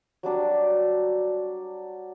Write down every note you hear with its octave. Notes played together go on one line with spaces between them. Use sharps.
F#3 G3 D4